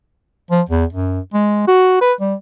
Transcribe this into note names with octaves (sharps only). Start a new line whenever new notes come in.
F3
E2
F#2
G#3
F#4
B4
G3